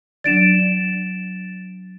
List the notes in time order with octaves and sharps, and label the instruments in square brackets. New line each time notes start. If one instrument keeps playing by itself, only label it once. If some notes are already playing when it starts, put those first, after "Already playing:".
[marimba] F#3 D4 D5 [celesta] A6 D7 E7